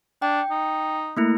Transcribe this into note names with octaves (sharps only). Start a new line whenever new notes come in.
D4 G5
D#4
A3 A#3 E4